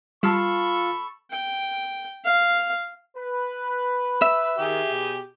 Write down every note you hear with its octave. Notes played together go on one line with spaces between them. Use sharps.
G3 F4 A4 F5 A5 B5 C#6
G5
F5
B4
E5
D#3 G4 G#4
B2